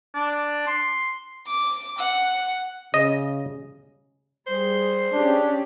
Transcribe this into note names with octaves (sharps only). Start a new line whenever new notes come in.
D4
C6
D6
F#5
C#3 D#5
G3 G#4 C5
C#4 D4 G4 G#4